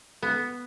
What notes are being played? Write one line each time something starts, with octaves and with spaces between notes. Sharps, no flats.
B3